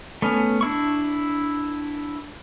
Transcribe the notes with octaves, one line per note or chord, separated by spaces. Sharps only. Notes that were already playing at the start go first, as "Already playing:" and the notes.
A3 B3 C#4
D4 E4 C#6